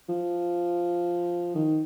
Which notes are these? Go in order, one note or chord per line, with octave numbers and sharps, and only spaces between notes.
F3
D#3